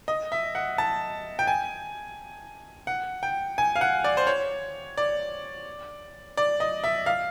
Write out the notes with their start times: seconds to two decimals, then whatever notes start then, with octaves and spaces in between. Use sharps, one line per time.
0.08 D#5
0.32 E5
0.55 F#5
0.78 A5
1.39 G5
1.47 G#5
2.87 F#5
3.23 G5
3.58 G#5
3.76 F5
3.81 F#5
4.04 D5
4.17 C5
4.27 C#5
4.98 D5
6.37 D5
6.60 D#5
6.84 E5
7.06 F5